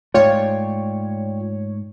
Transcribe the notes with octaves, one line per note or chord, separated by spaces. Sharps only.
G#2 A3 F4 C#5 D5 G5